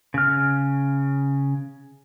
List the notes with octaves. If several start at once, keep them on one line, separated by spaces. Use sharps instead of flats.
C#3 F6